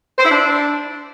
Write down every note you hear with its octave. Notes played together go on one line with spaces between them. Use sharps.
C5
E4
D4